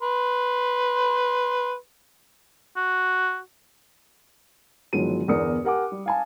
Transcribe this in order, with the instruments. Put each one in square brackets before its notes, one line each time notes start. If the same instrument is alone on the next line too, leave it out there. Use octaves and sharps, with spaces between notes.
[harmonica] B4 C6
[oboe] F#4
[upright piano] G1 D#3 F3 F#3 G#3 D#7
G1 E2 A#4 D5 D#6 C#7
G4 A#4 F#5 G#5 D6
G3
F5 G#5 A5